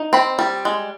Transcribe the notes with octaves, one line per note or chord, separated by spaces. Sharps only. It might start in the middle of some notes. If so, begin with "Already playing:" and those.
Already playing: D#4
C4 B5
G3
G#3